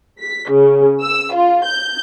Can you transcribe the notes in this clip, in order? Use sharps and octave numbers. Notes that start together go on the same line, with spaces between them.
B6
C#3
E6
F4
G6